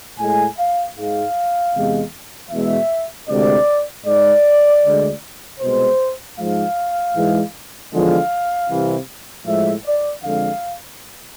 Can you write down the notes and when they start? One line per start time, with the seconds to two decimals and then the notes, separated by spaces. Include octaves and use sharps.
0.20 A2 G#3 G#5
0.58 F5
0.97 G#2 G#3 F5
1.75 E2 C3 G#3
2.51 E2 B2 G#3 E5
3.29 D2 C3 G#3 D5
4.06 G#2 G#3 D5
4.83 D2 D3 G#3
5.60 C2 B2 G#3 C5
6.38 G#2 F3 G#3 F5
7.15 G#2 E3 G#3
7.92 E2 D3 F3 G#3 F5
8.69 C2 C3 E3
9.46 A2 F3 G#3 E5
9.85 D5
10.24 F2 D3 G#3 F5